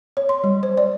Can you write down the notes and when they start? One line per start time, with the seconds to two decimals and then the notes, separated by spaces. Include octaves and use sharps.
0.17 C#5
0.29 C6
0.44 G3
0.63 C5
0.77 D5